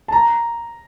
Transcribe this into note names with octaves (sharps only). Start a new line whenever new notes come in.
A5
A#5